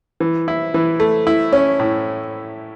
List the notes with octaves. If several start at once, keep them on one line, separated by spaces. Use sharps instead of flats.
E3
E4
E3
A3
E4
C#4
A2